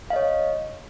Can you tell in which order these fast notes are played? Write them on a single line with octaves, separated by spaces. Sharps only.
F5 D#5 C#5